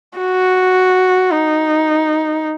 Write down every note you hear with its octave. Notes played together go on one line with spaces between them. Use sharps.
F#4
D#4